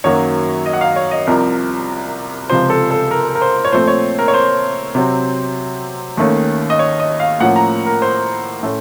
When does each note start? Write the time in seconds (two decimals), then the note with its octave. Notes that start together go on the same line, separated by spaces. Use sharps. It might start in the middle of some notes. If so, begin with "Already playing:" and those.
0.04 F#2 D#3 F#3 A#3 C#5
0.66 D#5
0.73 F#5
0.81 F5
0.96 C#5
1.11 D#5
1.27 C2 C3 F3 A#4
2.49 C#2 C3 F3 C5
2.70 A4
2.91 A4
3.11 A#4
3.35 A#4
3.42 C5
3.65 C#5
3.72 A#2 F3 A3 C4 C5
3.88 C#5
4.19 A#4
4.28 C#5
4.34 C5
4.95 C3 F#3 C4
6.17 D#2 D#3 A3 C#4
6.70 D#5
6.79 C#5
7.00 D#5
7.20 F5
7.40 A2 F3 A#3 C#4 F#5
7.56 A#5
7.86 A#4
8.02 C5
8.63 A2 A3 C#4